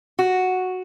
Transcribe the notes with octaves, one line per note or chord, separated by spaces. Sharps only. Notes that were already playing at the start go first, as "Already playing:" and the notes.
F#4